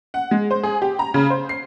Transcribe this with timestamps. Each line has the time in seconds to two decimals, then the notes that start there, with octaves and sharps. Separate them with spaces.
0.14 F#5
0.31 G#3
0.51 C5
0.63 G#4
0.82 G4
0.99 A#5
1.14 C#3
1.30 C5
1.49 C7